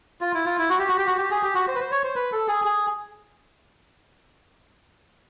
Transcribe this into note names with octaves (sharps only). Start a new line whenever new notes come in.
F4
E4
F4
E4
F#4
G4
F#4
G4
F#4
G4
G#4
G4
F#4
C5
B4
C5
C#5
C5
B4
A4
G#4
G#4